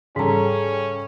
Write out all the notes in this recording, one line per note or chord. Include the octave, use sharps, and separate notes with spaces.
G#2 C#3 G3 C#4 G#4 A4 A#5